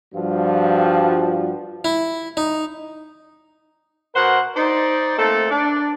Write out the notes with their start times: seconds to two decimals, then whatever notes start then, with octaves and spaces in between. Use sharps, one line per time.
0.15 G2 F3 G3 F4 F#4
1.85 E4
2.37 D#4
4.14 B2 A#4 C5 F#5
4.56 D#4 C5 D5
5.18 A3 A#3 C4 A4
5.51 D4 D5